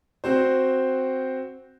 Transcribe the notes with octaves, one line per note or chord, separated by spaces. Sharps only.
C4 F#4 C5